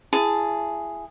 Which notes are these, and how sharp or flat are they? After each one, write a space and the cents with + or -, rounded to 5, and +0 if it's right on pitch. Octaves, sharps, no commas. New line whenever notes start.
E4 +30 G#4 +0 A5 +0